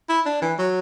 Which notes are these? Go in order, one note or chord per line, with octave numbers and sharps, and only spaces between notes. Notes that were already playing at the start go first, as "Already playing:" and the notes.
E4
D4
E3
F#3